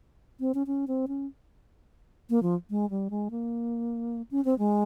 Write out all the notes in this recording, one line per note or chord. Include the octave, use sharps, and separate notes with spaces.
C4
C#4
C#4
C4
C#4
A#3
F3
G#3
G3
G#3
A#3
C#4
C4
G#3